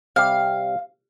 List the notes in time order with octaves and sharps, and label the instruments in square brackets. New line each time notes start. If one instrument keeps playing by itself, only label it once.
[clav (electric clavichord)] C3 G3 G4 [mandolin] F5